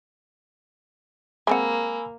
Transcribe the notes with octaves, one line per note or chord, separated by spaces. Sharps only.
G#3 A#3 C4 F#5 G#5 B5 E6